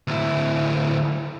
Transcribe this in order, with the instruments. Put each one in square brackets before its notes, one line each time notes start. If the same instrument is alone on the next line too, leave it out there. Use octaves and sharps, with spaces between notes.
[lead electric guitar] D2 E4